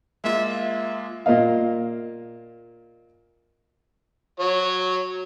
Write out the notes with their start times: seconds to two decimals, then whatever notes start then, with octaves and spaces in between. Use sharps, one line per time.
0.24 G#3 A#3 F4 E5
0.54 E5
1.26 A#2 A#3 D#5 F5
4.40 F#3 C#5